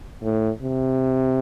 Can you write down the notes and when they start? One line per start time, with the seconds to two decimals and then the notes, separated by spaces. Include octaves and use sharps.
0.23 A2
0.62 C3